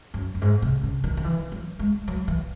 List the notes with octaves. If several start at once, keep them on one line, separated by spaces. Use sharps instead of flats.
F#2
F#2
G#2
C3
C#3
D#3
D#3
E3
F#3
G#3
F#3
E3